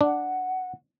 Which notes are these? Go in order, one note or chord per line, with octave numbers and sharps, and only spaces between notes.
D4 F#5